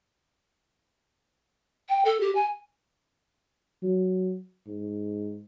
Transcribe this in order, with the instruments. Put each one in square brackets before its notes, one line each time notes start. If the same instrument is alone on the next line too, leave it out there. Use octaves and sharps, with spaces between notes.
[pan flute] G5
A4
G4
G#5
[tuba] F#3
G#2